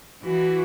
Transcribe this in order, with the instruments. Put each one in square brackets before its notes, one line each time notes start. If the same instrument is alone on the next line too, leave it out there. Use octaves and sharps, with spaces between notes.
[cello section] E3 [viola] F#4